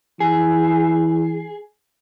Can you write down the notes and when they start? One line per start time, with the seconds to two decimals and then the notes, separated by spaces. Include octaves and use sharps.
0.20 E3 G#4